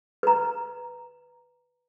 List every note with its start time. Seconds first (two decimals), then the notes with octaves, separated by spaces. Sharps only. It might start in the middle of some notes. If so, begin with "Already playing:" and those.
0.23 B4 A#5